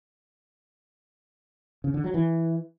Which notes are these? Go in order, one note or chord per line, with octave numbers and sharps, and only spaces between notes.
C#3
D3
F#3
E3